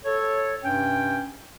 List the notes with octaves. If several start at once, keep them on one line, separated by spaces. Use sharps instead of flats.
A4 C#5
G2 C3 C#4 G5